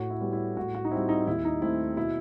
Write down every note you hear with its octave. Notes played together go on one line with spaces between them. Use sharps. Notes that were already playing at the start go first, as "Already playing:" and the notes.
Already playing: A2 F#4
E4
G3 B3
E4
A2 F#4
F#4
D#4
G3 C4 E4
D#4
D#2 E4
D#4
D#3 A3 C4 E4
B2 E4